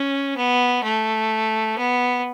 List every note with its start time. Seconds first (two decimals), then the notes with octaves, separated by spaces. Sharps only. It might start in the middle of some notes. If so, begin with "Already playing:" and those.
Already playing: C#4
0.37 B3
0.84 A3
1.78 B3